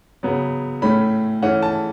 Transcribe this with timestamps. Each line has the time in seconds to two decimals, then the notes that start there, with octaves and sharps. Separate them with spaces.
0.23 C#3 F#3 B3
0.82 A2 A3 C#4 B5
1.43 E3 A3 C#4 F#5
1.62 A5